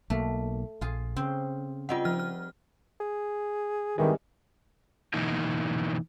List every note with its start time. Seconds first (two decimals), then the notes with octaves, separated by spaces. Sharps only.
0.10 B1 A3 A#3
0.81 A#1 F4 G#4
1.16 C#3 C4
1.89 G3 C4 F4 G#4 D#5 F#5
2.05 F3 F6
2.19 F6
3.00 G#4
3.98 G#1 D#3 E3 G3 G#3
5.14 B2 E3 A#3 D#4 E4